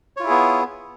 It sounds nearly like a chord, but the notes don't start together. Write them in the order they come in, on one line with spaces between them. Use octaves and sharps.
C#5 F4 E4 G#4 B3